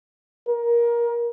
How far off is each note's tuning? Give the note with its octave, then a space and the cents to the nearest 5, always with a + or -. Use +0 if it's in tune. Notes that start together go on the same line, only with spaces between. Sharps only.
A#4 +20